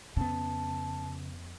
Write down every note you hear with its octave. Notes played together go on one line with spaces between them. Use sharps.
F2 C#3 B3 A5